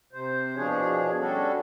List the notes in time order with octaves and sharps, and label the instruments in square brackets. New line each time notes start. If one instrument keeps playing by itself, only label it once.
[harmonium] C3 C5
E2 B2 F3 D4 G#4 C#5
G3 C#4 D4 F#4 A4